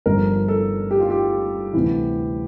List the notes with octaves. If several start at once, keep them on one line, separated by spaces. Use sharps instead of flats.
G1 G2 F3 A#4
A4
G4
F4
G4
D2 C3 E3